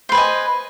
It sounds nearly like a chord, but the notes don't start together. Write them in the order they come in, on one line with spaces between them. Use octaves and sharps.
C5 B4 G#5 D#5